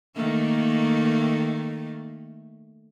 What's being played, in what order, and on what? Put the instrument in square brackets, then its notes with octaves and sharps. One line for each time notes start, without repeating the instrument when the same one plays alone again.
[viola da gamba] D#3 A3 A#3